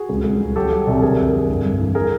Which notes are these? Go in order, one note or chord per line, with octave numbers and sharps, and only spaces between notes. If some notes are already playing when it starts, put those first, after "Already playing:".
Already playing: F#4 G#4
C#2
C#2
C#2
F#3 G4 A4
F#3
C2
D3 G#4 A#4
F2
F2
G2
G2
E3
G#4 A#4